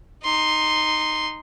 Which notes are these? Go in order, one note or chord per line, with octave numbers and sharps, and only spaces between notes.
D#4 C6